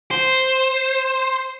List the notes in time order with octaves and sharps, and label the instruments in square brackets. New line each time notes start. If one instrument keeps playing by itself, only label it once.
[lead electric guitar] C5